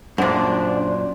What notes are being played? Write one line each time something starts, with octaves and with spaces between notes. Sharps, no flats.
F#2 A#2 D4 C5